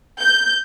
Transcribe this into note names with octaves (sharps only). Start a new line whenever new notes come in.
G6